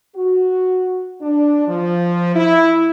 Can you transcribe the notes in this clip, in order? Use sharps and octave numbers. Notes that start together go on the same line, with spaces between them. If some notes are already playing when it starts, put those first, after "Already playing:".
F#4
D4
F3
E4